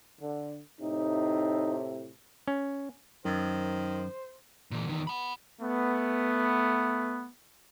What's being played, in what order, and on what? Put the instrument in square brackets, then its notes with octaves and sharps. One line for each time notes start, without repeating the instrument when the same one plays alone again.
[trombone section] D3
[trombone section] A2 C3 [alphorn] D#4
[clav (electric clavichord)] C#4
[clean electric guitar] F#2 [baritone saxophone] D#3 [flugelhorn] C5
[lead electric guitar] A#2 E3
E2 D#3
F#5 B5
[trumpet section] A3 B3